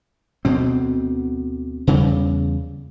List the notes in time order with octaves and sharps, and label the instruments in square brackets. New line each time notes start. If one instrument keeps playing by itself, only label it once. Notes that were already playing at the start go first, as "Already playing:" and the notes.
[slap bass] D2 B2 C4
E2 C#3 G3